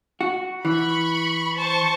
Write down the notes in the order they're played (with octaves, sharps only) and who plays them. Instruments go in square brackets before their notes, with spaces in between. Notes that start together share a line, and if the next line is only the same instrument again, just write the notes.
[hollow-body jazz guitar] F#4
[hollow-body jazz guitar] E3 [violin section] B5 C#6
[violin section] C5 A5 C#6